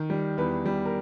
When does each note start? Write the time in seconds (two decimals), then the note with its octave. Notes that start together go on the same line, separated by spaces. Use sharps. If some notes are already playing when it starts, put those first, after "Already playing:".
Already playing: D#3
0.10 G3
0.38 E2 B4
0.66 G3
0.85 A#4